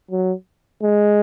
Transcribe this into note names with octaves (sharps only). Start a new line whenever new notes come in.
F#3
G#3